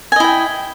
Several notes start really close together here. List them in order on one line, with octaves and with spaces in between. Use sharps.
G#5 D#5 E4 G5